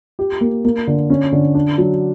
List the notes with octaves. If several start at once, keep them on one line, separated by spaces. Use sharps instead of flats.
G4
A#3
A#3
D3
C#4
D3
D4
F#3